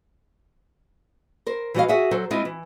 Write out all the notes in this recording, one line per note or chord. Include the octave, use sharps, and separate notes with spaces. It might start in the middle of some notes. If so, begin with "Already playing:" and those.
A#4 C5
E3 G3 F#4 G4 D#5 F5
F#4 G#4 E5 F#5 G#5
F#3 A4 C5
G#3 C4 E4 F4 D#5
E3